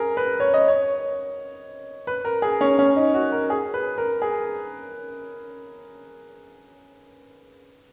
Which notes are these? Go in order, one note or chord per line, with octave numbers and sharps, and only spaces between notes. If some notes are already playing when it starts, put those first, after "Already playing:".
Already playing: G#4 A#4
B4
C#5
D#5
C#5
B4
A#4
G#4
C#4
C#4
D#4
F#4
A#4
G#4
B4
A#4
G#4